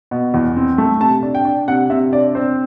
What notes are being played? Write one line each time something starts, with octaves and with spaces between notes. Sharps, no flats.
B2
E2
C4
A3
C3 A5
D4
G5
D4
C3 F#5
C3 E5
D4 D5
C4 C5